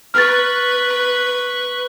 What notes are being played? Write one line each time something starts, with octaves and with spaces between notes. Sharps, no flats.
B4 C#6 F6 A6